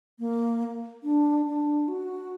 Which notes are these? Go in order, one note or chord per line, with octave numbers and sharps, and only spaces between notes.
A#3
D4
D4
F#4